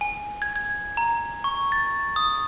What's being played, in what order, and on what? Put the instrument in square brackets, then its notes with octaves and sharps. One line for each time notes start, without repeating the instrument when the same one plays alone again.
[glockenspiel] G#5
G#6
G#6
A#5
C#6
A6
D#6